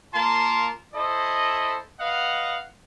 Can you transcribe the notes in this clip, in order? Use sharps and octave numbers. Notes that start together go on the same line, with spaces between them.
A#3 F4 A#4 A5 C6
E4 A4 C5 D#5
B4 D#5 F5 F#5